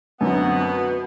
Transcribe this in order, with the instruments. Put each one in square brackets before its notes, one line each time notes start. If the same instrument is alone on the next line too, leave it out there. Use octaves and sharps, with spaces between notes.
[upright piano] F#2 D3 F#3 C4 [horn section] B2 B3